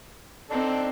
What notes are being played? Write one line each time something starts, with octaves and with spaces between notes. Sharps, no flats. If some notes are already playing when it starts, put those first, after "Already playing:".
C4 D4 D#4 A4